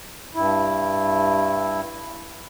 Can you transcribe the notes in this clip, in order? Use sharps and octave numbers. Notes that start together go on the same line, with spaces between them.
G2 E4